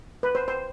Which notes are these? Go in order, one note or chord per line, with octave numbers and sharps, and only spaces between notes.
B4
C5
C5